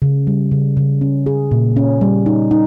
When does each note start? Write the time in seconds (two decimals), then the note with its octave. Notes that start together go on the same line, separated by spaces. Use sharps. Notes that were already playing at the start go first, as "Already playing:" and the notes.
0.02 C#3
0.27 G3
0.51 C#3
0.77 C#3
1.01 C#4
1.26 G#4
1.51 A#2
1.76 C#4
2.01 G3
2.26 D#4
2.51 D#4